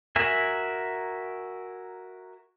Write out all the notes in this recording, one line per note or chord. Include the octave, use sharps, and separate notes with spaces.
F#4 A#4 E5 G#5